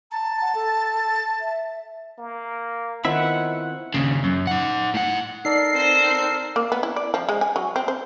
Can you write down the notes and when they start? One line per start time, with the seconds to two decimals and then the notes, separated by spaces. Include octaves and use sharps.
0.12 A5 A#5
0.42 F#5
0.55 A4
1.40 E5
2.18 A#3
3.05 D#3 B3 C4 E4 F4 F#5 B5
3.94 D#2 C#3
4.24 F#2
4.47 D#4 F#5
4.94 A2 F#5
5.45 D#4 A4 A#4 D5 C7
5.74 C4 C5
6.56 A#3
6.72 B3
6.83 E4
6.96 D5
7.14 F3
7.29 G#3
7.41 G#5
7.56 F#3
7.76 C4
7.88 C5